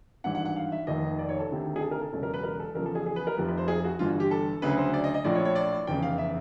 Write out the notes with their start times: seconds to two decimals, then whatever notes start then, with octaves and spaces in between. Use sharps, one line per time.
0.24 G#1 G2 E3 F#5
0.35 F#5
0.45 F#5
0.56 F5
0.72 E5
0.87 F1 D#2 D#3 D#5
1.19 D5
1.29 C#5
1.39 A4
1.49 D2 C3 D#3
1.76 G#4
1.82 A4
1.91 A#4
2.01 A4
2.12 E1 E2 C#3 F#3 A4
2.23 A#4
2.34 B4
2.43 A#4
2.60 A4
2.75 E2 C#3 F3 A#4
2.86 A4
2.95 G#4
3.06 G#4
3.16 B4
3.27 A#4
3.37 F1 F2 C3 F3 B4
3.48 B4
3.57 C5
3.68 G#4
3.84 F#4
3.99 G1 G2 E3 F4
4.10 F#4
4.20 G4
4.31 A4
4.62 D2 C#3 F#3 B4
4.77 C5
4.93 D5
5.04 D#5
5.14 D#5
5.24 A#1 A2 F3 D5
5.35 C#5
5.45 C#5
5.55 D5
5.87 F1 E2 C#3 G5
6.03 F5
6.18 E5